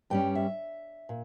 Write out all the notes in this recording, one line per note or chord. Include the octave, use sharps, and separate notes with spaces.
G2 G3 C#4 G5
E5
A#2